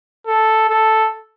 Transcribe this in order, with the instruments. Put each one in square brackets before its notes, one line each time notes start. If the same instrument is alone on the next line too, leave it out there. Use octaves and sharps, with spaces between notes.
[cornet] A4
A4